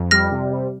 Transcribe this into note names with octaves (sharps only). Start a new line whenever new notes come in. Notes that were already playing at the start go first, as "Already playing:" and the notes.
Already playing: F2
G3 F6 A#6
C3
G3